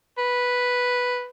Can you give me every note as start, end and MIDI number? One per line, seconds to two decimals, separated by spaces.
0.19 1.27 71